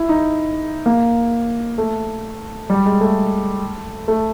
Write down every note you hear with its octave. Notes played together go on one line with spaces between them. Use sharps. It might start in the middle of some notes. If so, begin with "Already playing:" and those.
Already playing: E4
D#4
A#3
A3
G3
G#3
A3
A3